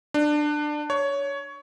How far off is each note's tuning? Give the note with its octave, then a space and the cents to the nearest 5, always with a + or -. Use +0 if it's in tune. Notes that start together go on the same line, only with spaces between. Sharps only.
D4 +20
C#5 +15